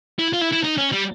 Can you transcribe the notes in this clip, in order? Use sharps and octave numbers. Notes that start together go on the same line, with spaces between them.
E4
F4
E4
E4
D#4
C#4
G3